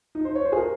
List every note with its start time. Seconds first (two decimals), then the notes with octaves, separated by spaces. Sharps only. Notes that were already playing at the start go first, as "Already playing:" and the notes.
0.15 D#4
0.25 C5
0.35 C#5
0.45 C5
0.52 G#4
0.57 A#4